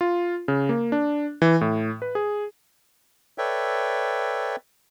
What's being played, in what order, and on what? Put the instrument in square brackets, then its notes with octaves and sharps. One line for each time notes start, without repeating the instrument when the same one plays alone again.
[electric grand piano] F4
C#3
A#3
D4
E3
A2
B4
G#4
[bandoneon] A4 B4 C#5 D5 E5 G5